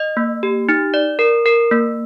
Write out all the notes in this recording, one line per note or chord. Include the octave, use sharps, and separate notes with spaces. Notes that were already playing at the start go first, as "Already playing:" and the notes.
Already playing: D#5
A#3
G4
D#4
D5
A#4
A#4
A#3